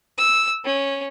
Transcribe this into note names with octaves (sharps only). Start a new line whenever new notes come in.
E6
C#4